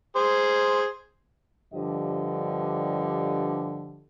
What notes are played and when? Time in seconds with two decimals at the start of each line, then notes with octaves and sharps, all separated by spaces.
0.16 G#4 C5
1.74 G2 D3 F3 G4 D5 D#5